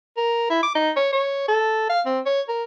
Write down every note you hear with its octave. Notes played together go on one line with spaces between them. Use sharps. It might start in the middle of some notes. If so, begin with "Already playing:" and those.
A#4
E4
D6
D#4
C#5
C#5
A4
F5
C4
C#5
A#4